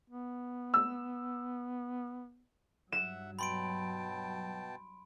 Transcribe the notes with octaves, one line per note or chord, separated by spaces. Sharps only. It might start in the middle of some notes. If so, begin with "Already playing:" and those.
B3
E6
G2 F#3 E5 F#5 E7
B2 G5 A5 B5 C6 D7